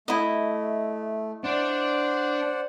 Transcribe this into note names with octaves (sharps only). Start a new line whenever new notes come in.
A3 E4 D#5
D4 C5 D5 F#5